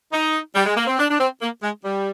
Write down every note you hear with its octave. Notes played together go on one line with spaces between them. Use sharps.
D#4
G3
G#3
A#3
C4
D4
D4
C4
A#3
G#3
G3